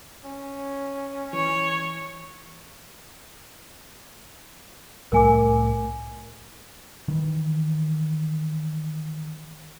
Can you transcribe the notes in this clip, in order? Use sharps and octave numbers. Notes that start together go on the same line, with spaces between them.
C#4
E3 C#5
C2 A2 A3 A#4 G#5 D6
D#3 E3